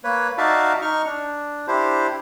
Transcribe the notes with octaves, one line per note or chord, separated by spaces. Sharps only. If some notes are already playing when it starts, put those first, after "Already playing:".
A#3 B4 C#5
D#4 F#4 D5 E5 F5 A5
D#4 C#6 F6
D4
D4 E4 G4 C5